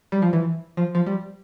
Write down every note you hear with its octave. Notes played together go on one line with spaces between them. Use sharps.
G3
F3
E3
F3
F3
G3